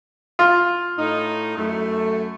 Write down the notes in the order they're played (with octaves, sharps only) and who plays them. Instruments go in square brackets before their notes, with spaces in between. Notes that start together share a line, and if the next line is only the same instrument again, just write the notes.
[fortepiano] F4
[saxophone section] A2 D#4
F#2 A3